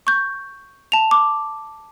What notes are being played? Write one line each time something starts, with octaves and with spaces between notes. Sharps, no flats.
C#6 G6
A5 F7
D6